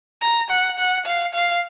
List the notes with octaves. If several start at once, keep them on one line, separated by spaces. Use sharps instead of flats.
A#5
F#5
F#5
F5
F5